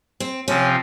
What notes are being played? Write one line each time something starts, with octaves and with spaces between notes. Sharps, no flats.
C4
C3 F3 C4 C#4